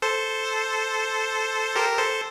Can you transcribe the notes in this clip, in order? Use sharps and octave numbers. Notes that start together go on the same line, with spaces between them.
A4 C5
G4 A#4
A4 C5